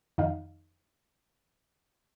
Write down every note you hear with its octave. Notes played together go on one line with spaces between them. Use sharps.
F2 D#3 D#4 F5